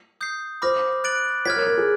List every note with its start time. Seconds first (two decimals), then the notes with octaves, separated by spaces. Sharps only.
0.21 D#6 G6 C7
0.62 C5 B5 D6 F6 A#6
1.04 F#6 A6 D7 F#7
1.46 C#5 F6 G#6 B6
1.56 A#4
1.67 A#4
1.78 G#4